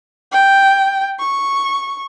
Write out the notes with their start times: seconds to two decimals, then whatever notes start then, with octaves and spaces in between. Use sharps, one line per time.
0.32 G5
1.19 C#6